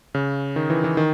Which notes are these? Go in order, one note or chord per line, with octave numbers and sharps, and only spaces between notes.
C#3
D#3
E3
E3
D#3